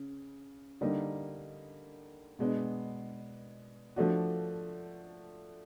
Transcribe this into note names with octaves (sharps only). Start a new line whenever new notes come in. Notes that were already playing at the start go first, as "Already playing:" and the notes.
Already playing: C#3
D3 G3 A#3 D#4
B2 G#3 B3 D4
F3 A3 D4 F#4